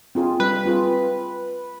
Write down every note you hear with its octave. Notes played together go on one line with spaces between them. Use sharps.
C4 F4 G#4
G3 B4
C4 F4 G#4